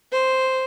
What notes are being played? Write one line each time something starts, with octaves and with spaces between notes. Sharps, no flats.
C5